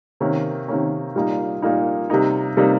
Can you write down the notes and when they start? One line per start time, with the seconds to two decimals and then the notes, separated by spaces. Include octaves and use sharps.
0.20 C3 D#3 A#3 C#4
0.68 C3 D#3 A#3 C#4
1.16 A#2 G3 A#3 D#4
1.62 A#2 G3 A#3 D#4
2.10 C3 G3 A#3 D#4
2.57 C3 G3 A#3 D#4